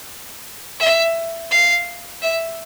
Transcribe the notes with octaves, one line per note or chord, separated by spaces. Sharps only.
E5
F5
E5